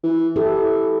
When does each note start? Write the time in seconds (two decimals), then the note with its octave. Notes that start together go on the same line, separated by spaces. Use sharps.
0.03 E3
0.36 E3 E4 G4 A4